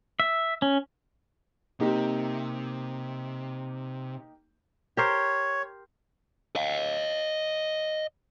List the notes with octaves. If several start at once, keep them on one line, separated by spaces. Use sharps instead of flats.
E5
C#4
C3 A#3 D#4 G4
G4 A#4 C5 C#5
D#5 F5